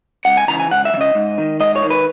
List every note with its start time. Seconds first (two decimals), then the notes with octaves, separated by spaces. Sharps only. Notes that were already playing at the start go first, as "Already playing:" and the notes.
0.25 C#2 F#5
0.37 G#5
0.48 C#3 E3 A#5
0.60 G#5
0.71 C#2 F#5
0.85 E5
0.94 E3
0.98 C#3 D#5
1.15 G#2
1.38 D#3
1.60 G#2 D#5
1.76 C#5
1.82 D#3
1.90 B4